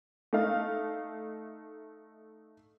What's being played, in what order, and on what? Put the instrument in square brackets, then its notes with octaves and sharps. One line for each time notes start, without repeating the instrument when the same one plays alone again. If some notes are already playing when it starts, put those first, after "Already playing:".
[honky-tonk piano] A3 D#4 F5